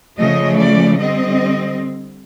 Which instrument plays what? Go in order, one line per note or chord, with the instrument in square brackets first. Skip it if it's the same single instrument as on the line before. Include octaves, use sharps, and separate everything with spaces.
[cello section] C#3 F3 A3 D#5
D5
D3 G3 C4 D#5